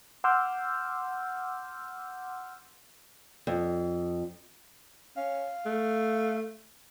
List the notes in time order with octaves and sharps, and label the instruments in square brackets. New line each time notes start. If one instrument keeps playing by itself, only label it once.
[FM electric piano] F#5 C6 D6 E6 F6 G6
[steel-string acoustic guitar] F2
[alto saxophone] C#4 [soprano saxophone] F5
[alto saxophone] A3